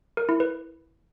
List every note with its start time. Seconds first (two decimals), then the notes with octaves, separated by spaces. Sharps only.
0.17 A#4
0.29 E4
0.40 B4